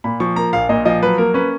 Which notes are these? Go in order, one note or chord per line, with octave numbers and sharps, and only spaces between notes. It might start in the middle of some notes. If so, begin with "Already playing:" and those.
A#2 B5
F3 C#6
A#3 A#5
A#1 F5
A#2 D#5
F3 D#5
F#3 B4
A#3 A#4
C#4 B4